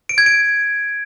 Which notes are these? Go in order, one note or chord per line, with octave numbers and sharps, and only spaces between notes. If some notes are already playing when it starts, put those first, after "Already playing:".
D7
G#6
D7